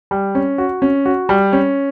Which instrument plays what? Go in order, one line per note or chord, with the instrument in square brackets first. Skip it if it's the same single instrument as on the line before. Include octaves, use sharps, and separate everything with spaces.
[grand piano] G3
C#4
F#4
C#4
F#4
G3
C#4